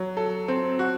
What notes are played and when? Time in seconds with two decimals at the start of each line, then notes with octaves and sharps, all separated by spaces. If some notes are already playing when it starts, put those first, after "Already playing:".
Already playing: F#3
0.17 A4
0.48 C4
0.79 F#4